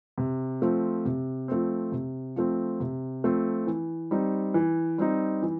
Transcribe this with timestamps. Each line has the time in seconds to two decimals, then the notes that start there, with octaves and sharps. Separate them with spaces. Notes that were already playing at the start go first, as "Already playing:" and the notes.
0.18 C3
0.62 F3 A3 C4
1.05 C3
1.48 F3 A3 C4
1.92 C3
2.36 F3 A3 C4
2.80 C3
3.24 F3 A3 C4
3.67 E3
4.11 G3 C4 D#4
4.54 E3
4.98 G3 C4 D#4
5.42 E3